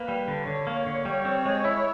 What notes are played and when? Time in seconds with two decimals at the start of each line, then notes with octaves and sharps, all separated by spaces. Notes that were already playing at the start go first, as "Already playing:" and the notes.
Already playing: A#3 B4
0.08 G3
0.28 D3
0.47 D3 C#5
0.67 A#3
0.86 D3
1.05 G3
1.25 C4
1.45 G#3
1.65 E4